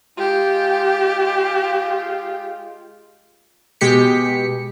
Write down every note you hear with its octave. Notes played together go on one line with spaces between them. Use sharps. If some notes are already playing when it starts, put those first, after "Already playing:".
G#3 F4 G4
B2 G#3 G4 B6 C#7